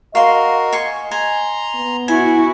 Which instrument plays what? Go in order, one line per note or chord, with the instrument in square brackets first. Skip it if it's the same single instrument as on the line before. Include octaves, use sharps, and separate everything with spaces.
[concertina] F#4 A#4 [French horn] D#5 [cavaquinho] F5 C6
[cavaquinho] G#5 C6 C#6
[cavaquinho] G#5 [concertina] A#5 C6
[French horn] B3
[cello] E4 F#4 [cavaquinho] G#5